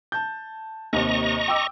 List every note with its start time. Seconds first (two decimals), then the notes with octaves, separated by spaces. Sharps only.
0.12 A5 G6
0.93 D#2 C3 D#5 A#5 C#6
1.48 G5 D6 E6